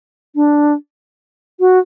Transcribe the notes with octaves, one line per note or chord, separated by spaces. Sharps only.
D4
F#4